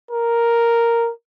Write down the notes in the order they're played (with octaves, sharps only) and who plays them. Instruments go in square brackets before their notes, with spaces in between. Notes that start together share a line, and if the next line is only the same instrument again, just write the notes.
[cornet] A#4